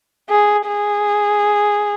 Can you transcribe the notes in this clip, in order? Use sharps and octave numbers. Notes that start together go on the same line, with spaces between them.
G#4
G#4